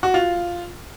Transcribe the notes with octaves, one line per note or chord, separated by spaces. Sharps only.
F#4
F4